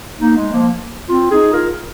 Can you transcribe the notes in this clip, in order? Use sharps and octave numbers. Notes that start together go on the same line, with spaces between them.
A#3 D#4
G#3
F3 A#3
C4 F4
D#4 G#4
F4 A#4